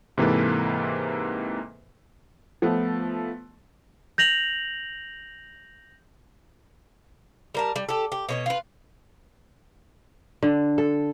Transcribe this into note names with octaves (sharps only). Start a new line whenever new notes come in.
G#2 C3 E3 A#3 A4 B4
F3 A3 B3
G6 A#6 F7 F#7
G3 A#4 A5
G3
G4 A4
G4
B2 C#5 D#5
F4 B4
D3
A4